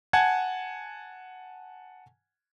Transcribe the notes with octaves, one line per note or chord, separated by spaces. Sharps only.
F#5 G#5 A5 G#6